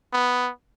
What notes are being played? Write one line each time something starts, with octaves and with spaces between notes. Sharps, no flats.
B3